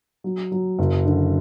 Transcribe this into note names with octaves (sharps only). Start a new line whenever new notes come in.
F#3
F#3
F#1
D3